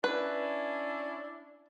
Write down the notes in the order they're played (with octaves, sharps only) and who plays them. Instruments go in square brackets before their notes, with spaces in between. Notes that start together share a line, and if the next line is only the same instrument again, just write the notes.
[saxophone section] C#4 D4 E4 [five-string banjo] B4